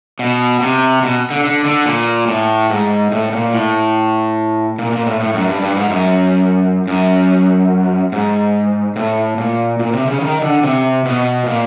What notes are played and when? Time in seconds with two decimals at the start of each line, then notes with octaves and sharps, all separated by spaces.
0.19 B2
0.61 C3
1.03 B2
1.30 D3
1.44 D3
1.65 D3
1.86 A#2
2.28 A2
2.70 G#2
3.12 A2
3.33 A#2
3.53 A2
4.78 A#2
4.92 A#2
5.06 A2
5.20 A2
5.34 F#2
5.48 G2
5.62 G2
5.76 G#2
5.90 F#2
6.87 F#2
8.12 G#2
8.96 A2
9.38 A#2
9.79 A#2
9.93 C3
10.07 C#3
10.21 D#3
10.42 D3
10.63 C3
11.05 B2
11.46 A#2